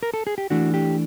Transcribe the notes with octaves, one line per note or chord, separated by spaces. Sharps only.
A#4
A4
G#4
G4
E3 A3 D4 F#4
G4